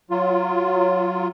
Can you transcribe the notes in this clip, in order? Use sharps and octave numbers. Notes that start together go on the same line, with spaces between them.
F#3 F4